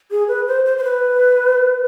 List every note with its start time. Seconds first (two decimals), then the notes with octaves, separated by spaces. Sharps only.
0.11 G#4
0.28 B4
0.47 C5
0.65 C5
0.78 C5
0.84 B4